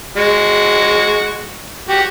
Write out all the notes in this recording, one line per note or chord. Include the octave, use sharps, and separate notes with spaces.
G#3 F#4
F#4 G4